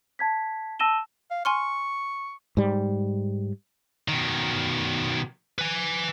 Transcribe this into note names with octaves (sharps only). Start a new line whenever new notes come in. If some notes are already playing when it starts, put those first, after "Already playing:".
A5 G#6 B6
A5 E6 A#6 D#7 E7 G7
F5
G#5 C6 C#6 F6
G#2 G3
B2 D#3
B4 G#5